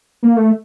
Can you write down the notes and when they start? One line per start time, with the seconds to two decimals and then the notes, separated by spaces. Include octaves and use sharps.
0.23 A#3
0.36 A3